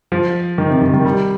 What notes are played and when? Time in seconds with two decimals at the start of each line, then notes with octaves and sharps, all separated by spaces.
0.12 F3
0.58 D#3
0.70 C3
0.82 D#3
0.93 D#3
1.05 G3